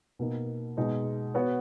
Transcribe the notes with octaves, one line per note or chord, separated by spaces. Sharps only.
B2 A#3 D#4
B2 G#3 D#4 G#4
B3 F#4 C#5